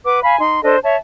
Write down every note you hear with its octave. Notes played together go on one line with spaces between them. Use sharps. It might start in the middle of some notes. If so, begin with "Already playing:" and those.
B4 F#5 D6
F5 G#5 B5
D#4 C6
D4 A4 C5 D#5
C#5 E5 A5